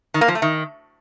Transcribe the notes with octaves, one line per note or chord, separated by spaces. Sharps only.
D#3
A#3
F3
A3
D#3